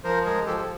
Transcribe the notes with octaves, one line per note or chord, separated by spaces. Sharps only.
F3 A#4 C5
G#3 G#4 A#4
F3 G4 A4
A4